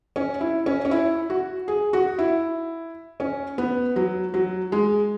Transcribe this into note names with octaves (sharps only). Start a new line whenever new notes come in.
C#4
E4
C#4
C#4
E4
F#4
G#4
F#4
E4
C#4
B3
F#3
F#3
G#3